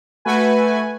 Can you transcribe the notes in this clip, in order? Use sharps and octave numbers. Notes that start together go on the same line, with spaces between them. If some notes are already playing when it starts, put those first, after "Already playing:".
A3 F#4 B4 G#5